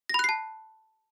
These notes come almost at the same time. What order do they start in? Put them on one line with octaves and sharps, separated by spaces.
A#6 B5 F#6 C7 A5